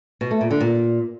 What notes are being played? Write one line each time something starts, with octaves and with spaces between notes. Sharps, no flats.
B2
A3
A#2
D3
A#2